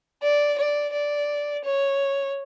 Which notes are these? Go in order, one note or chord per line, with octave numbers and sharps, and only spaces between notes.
D5
D5
D5
C#5